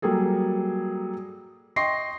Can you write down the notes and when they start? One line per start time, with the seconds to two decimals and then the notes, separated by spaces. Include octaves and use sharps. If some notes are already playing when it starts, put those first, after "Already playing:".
0.02 F#3 G3 A#3 G#4 A4
1.76 D#5 G5 C6 C#6 A#6 C7